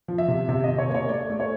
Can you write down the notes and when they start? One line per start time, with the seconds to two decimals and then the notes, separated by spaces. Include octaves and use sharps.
0.08 F3
0.18 E5
0.28 C3
0.49 C3 E5
0.64 C3 D#5
0.78 C#5
0.89 A#3
0.95 C#5
1.09 A3 D5
1.30 A3
1.40 C#5